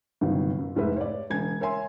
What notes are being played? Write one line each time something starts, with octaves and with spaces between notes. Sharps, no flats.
G1 C3 D#3 F#3
F#2
F1 G#2 G#3 B4 E5
C#5 D5
E1 C#3 G#5 G#6
A#4 C#5 E5 G#5 C6